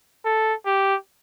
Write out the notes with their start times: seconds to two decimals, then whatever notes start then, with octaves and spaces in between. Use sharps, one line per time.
0.25 A4
0.66 G4